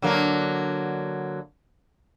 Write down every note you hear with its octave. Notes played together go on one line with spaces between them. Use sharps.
D3 F#3 A#3